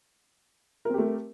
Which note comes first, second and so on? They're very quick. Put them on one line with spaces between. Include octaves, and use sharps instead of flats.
A#4 C4 G4 A3